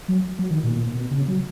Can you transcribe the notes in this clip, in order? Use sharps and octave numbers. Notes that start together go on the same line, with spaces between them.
F#3
F#3
D#3
A#2
A#2
B2
C#3
F#3